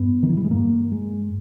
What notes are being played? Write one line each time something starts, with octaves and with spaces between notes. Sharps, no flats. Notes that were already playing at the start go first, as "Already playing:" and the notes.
Already playing: G2 B3
D#3
E3
G3
G#3
G2 A#3
G#3